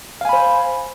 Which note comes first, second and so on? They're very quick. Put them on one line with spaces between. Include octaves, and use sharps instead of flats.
F5 G#5 B5 C5